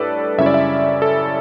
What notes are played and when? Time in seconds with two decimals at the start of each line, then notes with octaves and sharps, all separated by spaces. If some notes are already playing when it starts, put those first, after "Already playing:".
Already playing: A2 G3 D4 A4 B4 D5
0.38 F#2 C#3 G3 C#4 E4 E5
0.46 D5
0.54 E5
1.02 A4